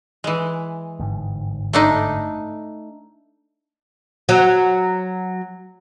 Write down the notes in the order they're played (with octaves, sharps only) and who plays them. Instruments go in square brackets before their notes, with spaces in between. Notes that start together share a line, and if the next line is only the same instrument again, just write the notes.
[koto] E3 G#3
[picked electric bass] G1 G#2
[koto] A3 D4 D#4
[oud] F#3